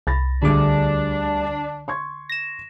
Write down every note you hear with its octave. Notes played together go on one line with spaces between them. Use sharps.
C2 B5 A6 A#6
D2 D3 G3 D4 G#4 D6
C6 C#6 G#6
A#6 E7